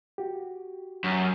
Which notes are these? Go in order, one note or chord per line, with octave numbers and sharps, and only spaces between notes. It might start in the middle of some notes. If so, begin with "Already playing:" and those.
F#4 G4
F#2